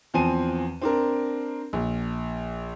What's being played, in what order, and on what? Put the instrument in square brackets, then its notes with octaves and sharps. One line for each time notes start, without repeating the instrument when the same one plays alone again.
[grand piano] E2 F3 C4 G#5 D#7
C4 D4 A#4
A#1